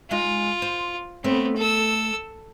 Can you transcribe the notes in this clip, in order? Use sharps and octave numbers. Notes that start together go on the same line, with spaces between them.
G#3 D#4 F4
C5
A3 B3 C4 B4 C#5
A4 E6